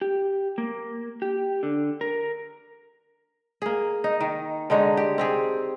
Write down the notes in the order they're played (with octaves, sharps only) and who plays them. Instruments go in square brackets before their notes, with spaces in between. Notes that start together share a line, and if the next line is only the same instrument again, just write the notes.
[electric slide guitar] G4
A#3
G4
D3
A#4
[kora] A#3 G#4
D#4
D#3
D3 G#3 D#4 C#5
G4
C4 G4 G#4